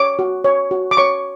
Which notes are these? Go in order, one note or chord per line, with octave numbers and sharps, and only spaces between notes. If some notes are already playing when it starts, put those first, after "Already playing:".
Already playing: C#5 D6
F#4
C#5
F#4
D6
C#5 C#6